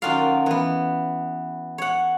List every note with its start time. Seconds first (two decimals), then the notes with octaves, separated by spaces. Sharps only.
0.02 F#2 D#3 F4 F#4 D5 F5
0.46 E3 B3
1.78 C#5 F#5